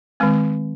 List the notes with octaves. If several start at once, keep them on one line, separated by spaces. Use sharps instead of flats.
D#3 G#3 C4